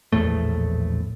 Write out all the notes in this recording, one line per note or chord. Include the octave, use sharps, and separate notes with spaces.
A#1 E2 A2 A3